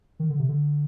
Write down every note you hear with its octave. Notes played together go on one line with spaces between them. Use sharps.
D#3
D3
C3
D3